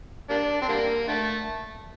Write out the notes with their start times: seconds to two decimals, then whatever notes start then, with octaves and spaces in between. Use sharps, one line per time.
0.30 G3 A#3 D4
0.62 C4
0.69 D3 G3 A#3
1.08 D3 A3